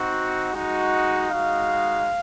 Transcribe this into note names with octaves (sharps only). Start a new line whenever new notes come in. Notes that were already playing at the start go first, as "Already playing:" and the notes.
Already playing: C4 D#4 F#4
G#3 D#4 F#4
G#3 D#4 F#4 F5